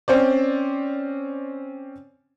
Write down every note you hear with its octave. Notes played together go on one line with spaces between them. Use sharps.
C4 C#4 C5 D5